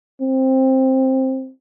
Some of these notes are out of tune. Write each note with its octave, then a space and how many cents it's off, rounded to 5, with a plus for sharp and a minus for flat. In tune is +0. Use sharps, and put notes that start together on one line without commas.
C4 +10